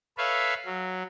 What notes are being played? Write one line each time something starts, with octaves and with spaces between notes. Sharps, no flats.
A4 B4 C#5 E5 F5
F#3